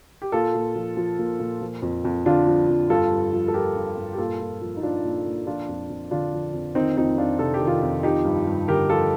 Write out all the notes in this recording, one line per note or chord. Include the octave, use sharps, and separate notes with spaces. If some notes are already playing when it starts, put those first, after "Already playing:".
G4
A#2 F4 A4
A#2
F3
F3
A#2
A#2
F3
F2
F2
D3 D4 F4
F3
F2
G2 F4 A4
G2
F3
A4
F3 G4 A#4
G2
G2
G4
A#2 F4 A4
A#2
F3
D#4
F3 D4 F4
A#2
A#2
F3 D4 F4
F2
F2
D3 D4 F4
F3
F2
D#3 C4 D#4
F2 C4 D#4
F2 D4 F4
C3 A4
G4
D#3
F4 A4
F2
F3 D#4 G4
G2
G2
D3 G4 A#4
F3 F4 A4